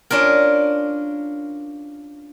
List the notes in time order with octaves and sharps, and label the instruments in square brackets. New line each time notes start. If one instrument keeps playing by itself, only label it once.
[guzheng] C#4 D4 F4 A#4